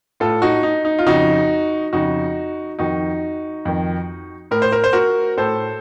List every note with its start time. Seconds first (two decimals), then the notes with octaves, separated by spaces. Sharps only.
0.20 A2 F4 A4
0.42 D#4 F#4
0.63 D#4
0.85 D#4
0.99 F4
1.06 F2 C#3 D#4 F#4
1.93 F2 C#3 D#4 F#4
2.79 F2 D#3 D#4 F#4
3.65 F2 D#3
4.51 A2 A#4
4.62 C5
4.72 A#4
4.84 C5
4.93 F#4 A#4
5.37 A2 A4 C5